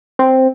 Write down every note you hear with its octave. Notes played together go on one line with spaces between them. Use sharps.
C4